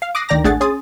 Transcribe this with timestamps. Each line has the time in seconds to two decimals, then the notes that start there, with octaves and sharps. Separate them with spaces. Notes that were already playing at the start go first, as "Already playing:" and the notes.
0.02 F5
0.15 D6 D#6 F#6 A#6 C7 D#7
0.29 D2 D#3 D5 G5 A#5 A#6
0.44 A1 A3 D4 G#4 F#5 A6
0.61 C#4 G#4 C6 D#6 A6